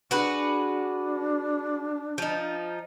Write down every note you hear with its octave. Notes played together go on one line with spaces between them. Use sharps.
D4 F#4 G#4 B4
F3 D#4